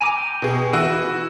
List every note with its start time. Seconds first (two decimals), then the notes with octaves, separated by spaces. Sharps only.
0.01 G#5 A#5 D6
0.17 G5
0.42 B2 G#4
0.73 E3 F#4
0.89 E4